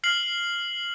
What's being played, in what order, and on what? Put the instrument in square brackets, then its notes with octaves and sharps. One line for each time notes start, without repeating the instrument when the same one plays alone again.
[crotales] F6 C7 F#7